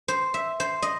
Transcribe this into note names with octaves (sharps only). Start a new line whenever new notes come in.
C5
E5
C5
D#5